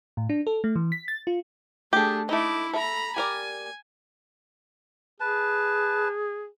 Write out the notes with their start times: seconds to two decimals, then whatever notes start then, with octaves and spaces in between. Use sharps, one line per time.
0.17 A2
0.30 D4
0.47 A4
0.64 A3
0.76 E3
0.92 B6
1.08 A6
1.27 F4
1.93 A3 D4 G4 G#4
2.29 A3 D#4 E4 D6
2.73 A4 E5 A#5 B5
3.16 G4 A#4 D5 G#5
5.20 G#4 B4 A5